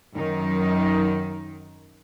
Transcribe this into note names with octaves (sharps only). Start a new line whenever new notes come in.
F#2 D#3 D#4